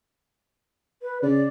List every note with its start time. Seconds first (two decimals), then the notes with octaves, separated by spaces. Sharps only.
1.03 B4
1.22 C#3 D5